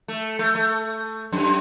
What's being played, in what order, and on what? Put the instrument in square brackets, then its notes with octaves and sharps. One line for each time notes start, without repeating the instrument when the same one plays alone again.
[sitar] A3
A3
A3
F#2